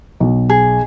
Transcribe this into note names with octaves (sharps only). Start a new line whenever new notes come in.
B1
G#4